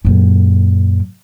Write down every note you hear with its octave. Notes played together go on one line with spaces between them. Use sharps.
F#2 A#2